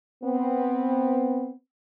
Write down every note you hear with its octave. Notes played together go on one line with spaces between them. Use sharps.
B3 C4